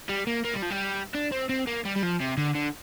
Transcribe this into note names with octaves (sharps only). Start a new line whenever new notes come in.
G3
A#3
A#3
G3
F3
G3
D4
C4
C4
A#3
G3
G3
F3
C3
D3
D3